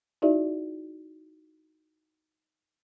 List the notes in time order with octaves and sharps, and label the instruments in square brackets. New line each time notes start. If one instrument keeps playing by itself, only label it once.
[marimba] D#4 E4 F#4 G#4 D5 E5